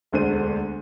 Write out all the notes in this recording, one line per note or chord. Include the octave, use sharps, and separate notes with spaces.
E1 D2 D3 C5 D#7